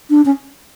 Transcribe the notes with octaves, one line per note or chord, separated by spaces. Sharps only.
D4
C#4